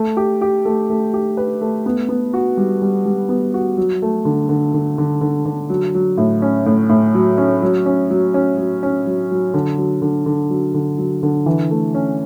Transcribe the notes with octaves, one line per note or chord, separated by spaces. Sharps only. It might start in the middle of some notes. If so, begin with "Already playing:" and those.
Already playing: A3
G4
G4
A3
A3
G4
B4
A3
B3
B3
F#4
G3
G3
G3
B3
F#4
F#3
A3
D3
D3
D3
D3
D3
D3
F#3
F#3
A2
C#4
A2
A2
F#3
C#4
F#3
C#4
F#3
C#4
F#3
C#4
F#3
F#3
D3
F#3
D3
D3
F#3
D3
F#3
D3
E3
A3
C#4